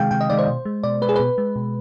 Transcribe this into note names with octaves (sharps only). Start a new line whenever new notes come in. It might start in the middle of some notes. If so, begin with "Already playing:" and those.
Already playing: C3 D#3 G#3 F5 G5
C3 G5
D#5
D#3 G#3 D5
C5
B2
G#3
B2 D5
G#3 B4
G#4
B2 B4
G#3
B2